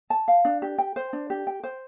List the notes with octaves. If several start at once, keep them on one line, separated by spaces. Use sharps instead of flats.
A5
F5
D4
G4
G5
C5
D4
G4
G5
C5